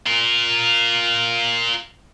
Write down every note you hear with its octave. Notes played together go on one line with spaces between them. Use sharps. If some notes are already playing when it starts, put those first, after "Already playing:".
F4 A#4